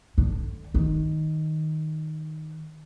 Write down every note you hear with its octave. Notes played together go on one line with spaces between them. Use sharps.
D3
D#3